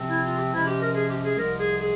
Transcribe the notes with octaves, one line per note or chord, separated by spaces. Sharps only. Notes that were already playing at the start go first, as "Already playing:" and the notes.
Already playing: C3 F3 C4
E4
F4
G4
C3 F3 G#3 C#4 E4
G4
A#4
G#4
G4
G#4
C2 C3 F3 G#3 A#4
G#4
G#4